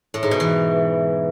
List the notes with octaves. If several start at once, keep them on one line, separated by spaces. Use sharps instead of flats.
A2
G#2
B2
E3